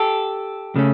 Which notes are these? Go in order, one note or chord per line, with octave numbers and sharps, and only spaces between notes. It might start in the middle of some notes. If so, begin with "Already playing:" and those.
Already playing: G4 A4
C#3 F#3 A3 C#4